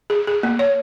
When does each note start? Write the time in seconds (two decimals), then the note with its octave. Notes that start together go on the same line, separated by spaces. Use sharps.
0.10 G#4
0.27 G#4
0.43 A#3
0.59 C#5